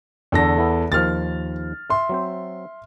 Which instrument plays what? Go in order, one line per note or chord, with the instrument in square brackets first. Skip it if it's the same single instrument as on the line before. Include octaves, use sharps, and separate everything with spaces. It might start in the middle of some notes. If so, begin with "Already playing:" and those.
[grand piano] E2 A4 A#6 [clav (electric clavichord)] D3 D4
[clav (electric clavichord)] B3 E4
[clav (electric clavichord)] D#2 D#3 F3 [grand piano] F6 A6
[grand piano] E5 C6
[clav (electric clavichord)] F#3 C4 C5